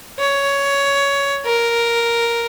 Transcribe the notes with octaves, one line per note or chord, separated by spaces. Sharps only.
C#5
A#4